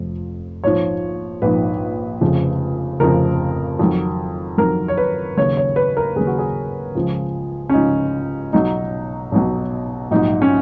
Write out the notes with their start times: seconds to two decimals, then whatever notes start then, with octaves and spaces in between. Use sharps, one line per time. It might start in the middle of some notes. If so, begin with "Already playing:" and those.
Already playing: F1 F2 F3
0.64 A#1 G#2 F3 C#5
1.42 A#1 G#2 F3 B4
2.21 F1 F2 C#3 F3
3.00 F1 F2 C#3 F3 A#4
3.79 F2 D#3 F#3
4.58 F2 D#3 F#3 A#4
4.88 C#5
4.97 B4
5.37 D#2 C#3 F#3 C#5
5.57 C#5
5.76 B4
5.97 A#4
6.16 D#2 C#3 F#3 G#4
6.27 F#4
6.39 G#4
6.95 C#2 C#3 F3
7.69 C#4
7.73 C#2 C#3 F3 D#4
8.53 B1 B2 F#3 D#4
9.32 B1 B2 F#3
10.11 A#1 G#2 F#3 D#4
10.42 C#4